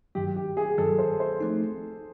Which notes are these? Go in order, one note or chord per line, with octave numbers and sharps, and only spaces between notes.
G2 D#3 F#3 G4
G4
G#4
G2 D#3 F#3 A4
C5
C5
F3 A3 C4 D#4